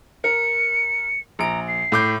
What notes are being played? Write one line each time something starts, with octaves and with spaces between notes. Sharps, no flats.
A#4 C#7
A#1 A#5 D7
C7
A2 D6 G6